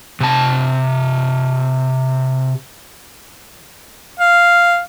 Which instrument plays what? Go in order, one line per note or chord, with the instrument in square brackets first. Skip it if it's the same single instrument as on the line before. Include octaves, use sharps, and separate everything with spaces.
[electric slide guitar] C3 A5
[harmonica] F5